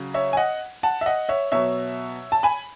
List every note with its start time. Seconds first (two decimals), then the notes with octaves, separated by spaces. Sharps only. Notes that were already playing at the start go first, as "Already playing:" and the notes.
Already playing: C#3 F#3
0.14 C#5 E5
0.33 G#5
0.37 D#5 F#5
0.83 F#5 A5
1.01 E5
1.06 D#5 F#5
1.29 C#5 E5
1.52 B2 F#3 C#5 E5
2.32 A5
2.43 G#5 B5